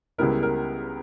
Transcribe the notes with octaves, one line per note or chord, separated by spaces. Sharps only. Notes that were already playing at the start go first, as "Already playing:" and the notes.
C#2 C#3 G3 B3 E4 A#4
A#4